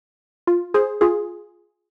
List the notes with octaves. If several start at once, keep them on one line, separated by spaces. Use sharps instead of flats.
F4
G#4 C5
F4 G#4